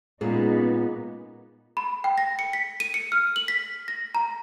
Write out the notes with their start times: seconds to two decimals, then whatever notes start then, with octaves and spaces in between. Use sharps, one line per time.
0.21 A#2 G#3 B3 C#4 D#4 G#4
1.77 B5
2.04 G5
2.18 A#6
2.39 C#7
2.53 B6
2.80 D#7
2.94 C#7
3.12 F6
3.36 F#7
3.48 B6
3.88 A#6
4.15 A#5